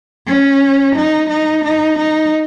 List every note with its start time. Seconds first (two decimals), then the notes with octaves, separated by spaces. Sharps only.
0.27 C#4
0.95 D#4
1.29 D#4
1.64 D#4
1.98 D#4